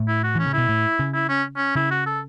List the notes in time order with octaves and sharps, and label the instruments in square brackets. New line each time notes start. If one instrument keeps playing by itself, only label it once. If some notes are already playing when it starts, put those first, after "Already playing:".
Already playing: [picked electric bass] A2
[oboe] E4
F#4
[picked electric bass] E3 [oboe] C#4
[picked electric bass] C#3
[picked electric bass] B2 [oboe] E4
[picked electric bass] A2
C#3
[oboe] E4
C#4
C#4
[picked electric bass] C#3 [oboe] E4
[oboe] F#4
A4